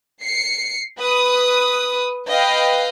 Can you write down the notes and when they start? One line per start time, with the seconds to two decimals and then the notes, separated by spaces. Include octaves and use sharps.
0.22 C7 C#7
0.98 B4 D#6
2.29 B4 D#5 F5 G5